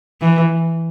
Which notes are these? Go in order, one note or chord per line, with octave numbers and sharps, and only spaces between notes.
E3